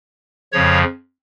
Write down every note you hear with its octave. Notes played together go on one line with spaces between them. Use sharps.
F2 C#3 F3 C#5